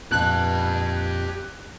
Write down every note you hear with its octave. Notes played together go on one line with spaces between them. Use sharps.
F2 A#2 G4 A5 F#6